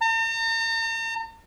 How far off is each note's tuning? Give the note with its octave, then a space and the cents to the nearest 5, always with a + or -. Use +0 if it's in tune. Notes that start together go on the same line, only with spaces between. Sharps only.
A#5 -45